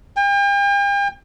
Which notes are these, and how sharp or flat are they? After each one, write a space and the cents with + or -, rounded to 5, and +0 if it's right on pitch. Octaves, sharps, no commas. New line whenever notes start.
G5 +40